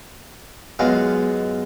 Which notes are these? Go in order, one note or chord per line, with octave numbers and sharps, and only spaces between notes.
F#2 G#3 B3 F4